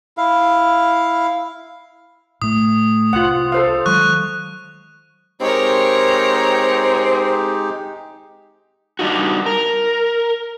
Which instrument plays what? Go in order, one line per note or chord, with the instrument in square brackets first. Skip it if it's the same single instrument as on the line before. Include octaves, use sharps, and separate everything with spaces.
[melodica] E4 F5
[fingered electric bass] A2 A3 [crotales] D#6
[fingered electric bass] C2 [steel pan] F4 F#5
[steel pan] A4 C5 F5
[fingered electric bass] D#3 F#3 G#3 [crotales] C#6 F#6
[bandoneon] G#3 D#4 G4 [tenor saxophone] C4 [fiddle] A#4 C#5
[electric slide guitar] G3 D4 D#4 F#4
A#4